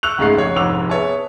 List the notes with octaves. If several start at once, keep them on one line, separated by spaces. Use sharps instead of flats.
C#6 E6 F#6 F7
C#2 G#2 C#3 G#3 A3 C7
F1 C#5 G#6
F1 C2 G#2 D6 E6 F7
B3 G#4 C#5 E5 A5